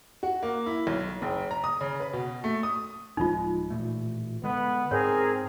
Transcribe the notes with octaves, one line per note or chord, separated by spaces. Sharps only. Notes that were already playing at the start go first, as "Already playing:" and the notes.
F#4
A#3
E4
B1
F#1
A#5
D#6
C#3
B4
B2
A3
D#6
D1 F3 G#3 D#4 F4
A1 A#2 A3
D3 G#3 B3
G#2 C4 G#4 A#4 C#5 A#5